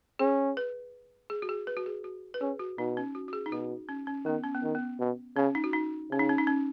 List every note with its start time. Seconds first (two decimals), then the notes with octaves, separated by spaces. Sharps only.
0.19 C#4 G#4
0.57 B4
1.30 G#4
1.42 F#4
1.49 G#4
1.67 B4
1.77 F#4
1.86 G#4
2.04 F#4
2.34 B4
2.41 C#4 G#4
2.59 F#4
2.78 B2 D#4
2.97 C#4
3.15 F#4
3.28 F#4
3.33 G#4
3.46 D#4
3.52 B2 F#4
3.89 C#4
4.07 C#4
4.25 D#3 B3
4.44 C#4
4.55 B3
4.63 D#3
4.75 B3
5.00 B2
5.36 C#3 C#4
5.55 D#4
5.64 F#4
5.73 D#4
6.11 C#3 C#4
6.19 D#4
6.29 C#4
6.38 D#4
6.47 C#4